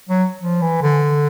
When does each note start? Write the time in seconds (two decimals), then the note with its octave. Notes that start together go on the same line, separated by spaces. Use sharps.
0.09 F#3
0.41 F3
0.61 E3
0.82 D3